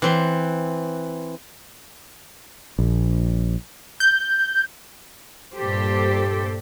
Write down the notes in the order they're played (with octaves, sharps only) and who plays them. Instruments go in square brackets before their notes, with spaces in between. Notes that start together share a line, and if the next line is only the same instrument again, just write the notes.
[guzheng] E3 C4 C6
[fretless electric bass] A#1
[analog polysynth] G6
[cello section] G2 A#2 G4 A4 C5